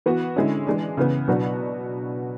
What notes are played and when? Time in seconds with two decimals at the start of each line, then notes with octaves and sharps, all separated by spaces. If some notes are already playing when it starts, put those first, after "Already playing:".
0.06 E3 B3 F#4
0.36 D3 G#3 C#4 E4
0.67 E3 G#3 D4
0.97 C#3 E3 B3
1.28 B2 F#3 B3 D4 F#4